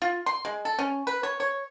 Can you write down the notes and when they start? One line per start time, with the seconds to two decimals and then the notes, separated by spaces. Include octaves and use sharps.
0.02 F4
0.26 C6
0.45 G#3
0.65 A4
0.79 C#4
1.07 B4
1.23 C#5
1.40 C#5